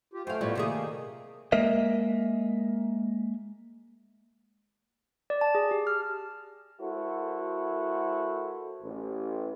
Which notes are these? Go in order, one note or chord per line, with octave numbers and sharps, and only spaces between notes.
F4 G4
F#2 A3 C5 F5 G5
F#2 A2 G3 B3 F4 F#4
C3 D#3 A3 A#3 G#4
G#3 A#3 A#4 D#5 E5
D5
A5
G#4
G4
F6
G#3 E4 F#4 A4 A#4 C5
A1